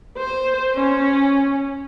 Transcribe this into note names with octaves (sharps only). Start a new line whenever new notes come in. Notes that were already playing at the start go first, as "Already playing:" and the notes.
C5
C#4